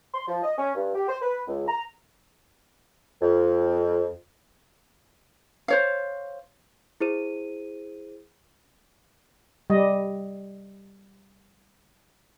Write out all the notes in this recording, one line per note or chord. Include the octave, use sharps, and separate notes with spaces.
C6
F3
D#5
C#4
G2
G4
C5
B4
C#2
A#5
F2
C5 C#5 F5
E4 G#4 C5 D#7
G3 D#5